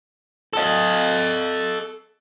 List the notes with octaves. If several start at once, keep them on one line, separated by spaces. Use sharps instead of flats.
A4 D#5